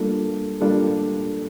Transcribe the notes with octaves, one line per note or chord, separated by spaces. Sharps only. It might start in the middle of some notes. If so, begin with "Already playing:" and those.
Already playing: G3 A#3 D4 F4 A4
G3 A#3 D4 F4 A4